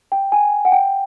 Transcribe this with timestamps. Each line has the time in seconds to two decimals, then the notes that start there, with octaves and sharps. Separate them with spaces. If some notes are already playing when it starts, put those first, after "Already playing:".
0.12 G5
0.32 G#5
0.65 F#5
0.72 G5